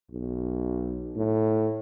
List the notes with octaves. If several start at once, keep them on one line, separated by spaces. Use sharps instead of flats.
B1
A2